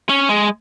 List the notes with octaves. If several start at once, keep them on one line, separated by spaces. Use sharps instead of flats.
C#4
G#3